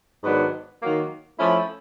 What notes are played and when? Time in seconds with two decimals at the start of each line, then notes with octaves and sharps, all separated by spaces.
0.24 G#2 D#3 F#3 B3 D4
0.81 D#3 F#3 A#3
1.39 F3 A3 C#4 E4